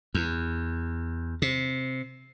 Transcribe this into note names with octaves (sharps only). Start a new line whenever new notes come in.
E2
C3